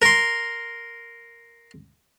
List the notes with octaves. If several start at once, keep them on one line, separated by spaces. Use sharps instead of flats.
A#4 C6